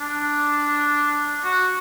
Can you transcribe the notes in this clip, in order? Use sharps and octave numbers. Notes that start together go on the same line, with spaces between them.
D4
F#4